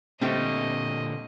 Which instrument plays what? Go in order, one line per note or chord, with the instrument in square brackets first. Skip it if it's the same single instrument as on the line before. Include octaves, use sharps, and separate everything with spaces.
[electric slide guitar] A#2 D3 [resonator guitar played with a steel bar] G3 A3 G5 [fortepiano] C4 [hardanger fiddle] D#5